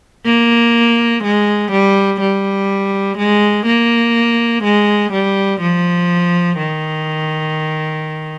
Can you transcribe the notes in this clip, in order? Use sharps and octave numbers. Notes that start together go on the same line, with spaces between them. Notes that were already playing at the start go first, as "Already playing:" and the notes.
A#3
G#3
G3
G3
G#3
A#3
G#3
G3
F3
D#3